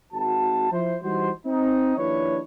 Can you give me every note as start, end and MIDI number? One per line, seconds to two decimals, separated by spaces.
0.13 0.70 32
0.13 0.70 66
0.13 0.70 81
0.71 0.96 53
0.71 0.96 64
0.71 0.96 72
1.02 1.30 52
1.02 1.30 55
1.02 1.30 63
1.02 1.30 66
1.02 1.30 72
1.45 1.97 60
1.45 1.97 63
1.97 2.39 39
1.97 2.39 53
1.97 2.39 62
1.97 2.39 64
1.97 2.39 71
1.97 2.39 73